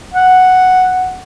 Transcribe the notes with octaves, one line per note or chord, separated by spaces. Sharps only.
F#5